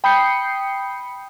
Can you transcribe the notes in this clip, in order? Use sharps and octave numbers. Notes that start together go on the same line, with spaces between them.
G5 B5 D#6 G6 C7 C#7